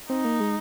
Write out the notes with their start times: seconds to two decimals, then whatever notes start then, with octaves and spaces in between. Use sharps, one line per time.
0.10 C4 D#4
0.25 A#3
0.40 G#3